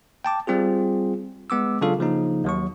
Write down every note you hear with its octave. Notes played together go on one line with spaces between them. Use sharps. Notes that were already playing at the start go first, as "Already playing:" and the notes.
G5 A5 D6
G3 C4 F4 G#4
G#3 B3 D6 E6
C#3 F#3 D4 F4 A4 F5
C#3 F3 A#3 D#4
D#2 F#3 C#6